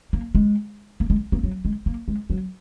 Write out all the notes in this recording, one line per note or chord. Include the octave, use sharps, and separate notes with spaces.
A#3
G#3
A#3
G#3
A#3
F#3
G#3
A#3
G#3
F#3